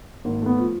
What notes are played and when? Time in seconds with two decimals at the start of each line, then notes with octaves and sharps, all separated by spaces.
0.25 G#1 A#3
0.42 A3 B3
0.58 F3